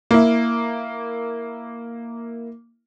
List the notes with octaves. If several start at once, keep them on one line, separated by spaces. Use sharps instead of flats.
A#3 E4